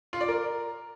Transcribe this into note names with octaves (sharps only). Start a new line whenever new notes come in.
F4
D5
A#4